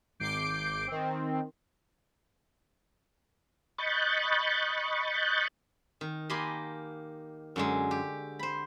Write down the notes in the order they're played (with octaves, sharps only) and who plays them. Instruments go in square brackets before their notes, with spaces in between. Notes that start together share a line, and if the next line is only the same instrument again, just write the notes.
[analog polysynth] G#1 D6 G6 C7 D7
D#3 C4
[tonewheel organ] D#5 B5 C#6 F#6 G6 A6
[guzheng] D#3
A#3 G4 D#5 G#5 B5 C6
F#2 D3 G#3
G4
C5 B5